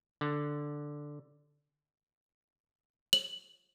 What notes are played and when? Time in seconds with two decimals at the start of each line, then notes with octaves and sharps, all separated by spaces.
0.21 D3
3.13 F#7